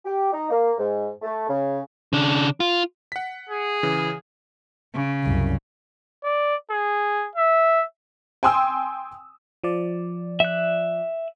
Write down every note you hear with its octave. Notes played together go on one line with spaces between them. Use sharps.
G4
D#4
A#3
G#2
A3
C#3
C#3 D4
F4
F#5 B6
G#4
C#3 E3
C#3
C2 F#2
D5
G#4
E5
G5 G#5 C6 D#6 E6
F3 D5
E5 F#6